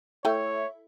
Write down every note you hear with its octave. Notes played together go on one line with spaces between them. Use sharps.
A3 E4 A4 C#5 E5 G5